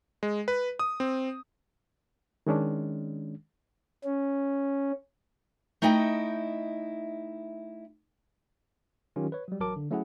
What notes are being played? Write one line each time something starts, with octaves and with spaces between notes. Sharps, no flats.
G#3
B4
D#6
C4
D#3 G#3 C#4 D4
C#4
A3 D#4 E4 D#5 G5
D#3 F#3 C#4 F4 G4
B4 C#5
F#3 G3
A1 F#3 A#4 A5 D6
D3
F#3 A3 C#4 E4 G#4 F#5